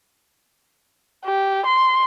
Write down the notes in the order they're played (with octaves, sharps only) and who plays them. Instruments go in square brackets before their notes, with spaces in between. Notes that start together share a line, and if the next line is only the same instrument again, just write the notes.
[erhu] G4
C6